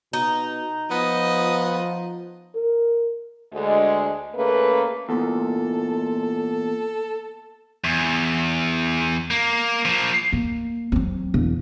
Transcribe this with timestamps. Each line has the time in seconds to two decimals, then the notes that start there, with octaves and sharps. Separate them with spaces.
0.13 B2 D#4
0.91 F3 B3 D#5
2.55 A#4
3.53 D2 D3 G#3
4.35 C#3 A3 A#3 B4
5.09 E2 A#2 A4
7.84 E2
9.31 A#3
9.85 F3 A#3
10.32 A#3
10.92 F#3 C4
11.34 E1